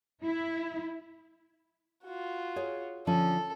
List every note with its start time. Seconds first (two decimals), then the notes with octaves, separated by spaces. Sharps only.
0.25 E4
2.04 F4 F#4
2.56 G#4 C#5 F5
3.07 D3 F3 C#4 A4